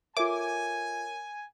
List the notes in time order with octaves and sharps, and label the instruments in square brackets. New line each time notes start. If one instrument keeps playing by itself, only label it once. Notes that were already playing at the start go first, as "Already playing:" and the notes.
[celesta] F4 A4 E5 [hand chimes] A#4 C#5 [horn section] G#5 [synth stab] D6